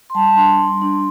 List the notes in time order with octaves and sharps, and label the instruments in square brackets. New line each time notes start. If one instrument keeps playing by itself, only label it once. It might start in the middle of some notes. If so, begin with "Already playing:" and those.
[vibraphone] C6
G3 A5
D4 C6
G3
D4